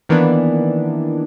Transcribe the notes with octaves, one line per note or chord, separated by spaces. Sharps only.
D#3 E3 A#3 B3 D4